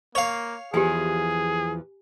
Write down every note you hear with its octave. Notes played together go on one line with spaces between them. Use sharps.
A#3 C#5 F5
E2 E3 F3 G4 G#4 G#5